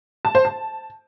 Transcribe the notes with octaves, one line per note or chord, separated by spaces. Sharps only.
A5
C5
A5